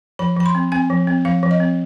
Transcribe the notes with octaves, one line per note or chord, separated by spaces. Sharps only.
F3 B5
F3 B5
C6
C4
C4 G#5
F3
C4
F3 F5
F3
D#5
C4